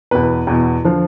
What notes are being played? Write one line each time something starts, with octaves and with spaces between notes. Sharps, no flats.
E2 B2 B4
E2 B2
D3 F3